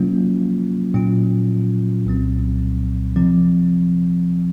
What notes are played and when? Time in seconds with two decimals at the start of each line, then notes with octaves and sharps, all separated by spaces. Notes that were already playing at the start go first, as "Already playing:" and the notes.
Already playing: C3 F#3 A#3 C#4 F4
0.94 A#2 F#3 C#4 F4
2.05 C2 A#2 F#3 C4
3.16 C3 F3 C4